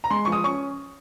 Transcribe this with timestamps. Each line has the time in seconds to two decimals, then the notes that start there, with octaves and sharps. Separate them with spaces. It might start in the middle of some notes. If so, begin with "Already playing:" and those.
0.04 A#5
0.10 G#3 C6
0.25 F3 C#6
0.32 D#6
0.44 C#4 C#6